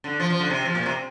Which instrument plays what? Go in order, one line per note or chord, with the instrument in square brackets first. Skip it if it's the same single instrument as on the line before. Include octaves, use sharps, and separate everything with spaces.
[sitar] D3
F3
F3
D3
C3
F3
A#2
C3